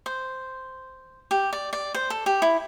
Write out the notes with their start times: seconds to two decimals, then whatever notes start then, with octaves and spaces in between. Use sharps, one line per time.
0.06 C5
1.31 G4
1.53 D5
1.73 D5
1.94 C5
2.10 A4
2.26 G4
2.42 E4